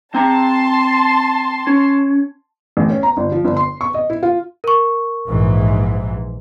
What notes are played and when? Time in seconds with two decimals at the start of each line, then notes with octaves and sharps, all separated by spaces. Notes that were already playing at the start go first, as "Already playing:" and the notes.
0.14 C4 A5 A#5 C6
1.67 C#4
2.77 A1
2.90 C#4
3.03 A#5
3.17 G1
3.32 F3
3.45 G1
3.57 C6
3.81 C#6
3.94 D#5
4.10 E4
4.23 F4
4.64 A#4 C#6
5.25 A#1 G#2 E3